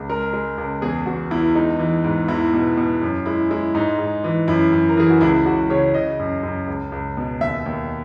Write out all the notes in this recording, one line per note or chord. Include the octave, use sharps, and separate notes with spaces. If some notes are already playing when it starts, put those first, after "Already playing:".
Already playing: C#2
G#3 A#4
G#3
C#2
E2 G#4
E2 F#4
E2 E4
G#3 D#4
E3
G#2
E2 E4
B2
B2
F#2
G#3 E4
G#3 E4
G#2 D#4
G#2
E3
F#2 E4
F#2
A#4
E3 G#4
F#4
C#2 E4
C#2 F#4
C#3 C#5
C#3 D#5
F#2
F#2
C#2
C#2
B2
D#2 E5
D#2